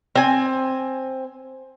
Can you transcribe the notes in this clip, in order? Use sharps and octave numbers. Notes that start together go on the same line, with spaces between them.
C4 G#5